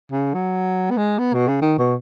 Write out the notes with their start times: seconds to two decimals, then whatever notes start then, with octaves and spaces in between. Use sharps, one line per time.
0.12 C#3
0.34 F#3
0.91 B3
0.97 G#3
1.18 B3
1.34 B2
1.48 C#3
1.61 D#3
1.78 B2